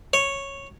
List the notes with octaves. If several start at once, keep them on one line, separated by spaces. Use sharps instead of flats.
C#5